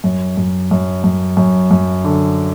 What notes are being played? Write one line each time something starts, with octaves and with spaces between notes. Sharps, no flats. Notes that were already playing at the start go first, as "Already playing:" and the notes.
F#2
F#2
F#2
F#2
F#2
F#2
D3